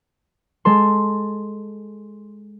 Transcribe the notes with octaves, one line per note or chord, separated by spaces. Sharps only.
G#3 A4 C6